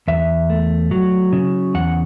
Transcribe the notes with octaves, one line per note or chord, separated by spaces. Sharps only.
E2 E5
A3
F#3
C#3
E2 F#5